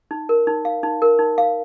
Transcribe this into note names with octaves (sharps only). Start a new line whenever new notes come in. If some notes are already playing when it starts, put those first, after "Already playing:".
D#4
A#4
D#4
F5
D#4
A#4
D#4
F5